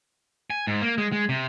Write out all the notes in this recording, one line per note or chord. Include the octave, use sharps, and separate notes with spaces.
G#5
G#2
A#3
G#3
G#3
C3